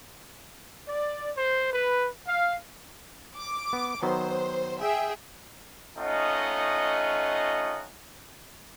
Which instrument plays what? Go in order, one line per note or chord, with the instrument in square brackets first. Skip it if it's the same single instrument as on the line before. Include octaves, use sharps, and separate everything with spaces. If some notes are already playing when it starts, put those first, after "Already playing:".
[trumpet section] D5
C5
B4
F5
[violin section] D6
[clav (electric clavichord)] B3
[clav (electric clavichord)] D#3 F#3 B3 [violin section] C5
[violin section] G#4 E5 G5
[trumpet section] A3 C#4 D#4 F4 D#5 F#5